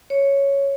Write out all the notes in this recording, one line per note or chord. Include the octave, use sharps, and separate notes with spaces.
C#5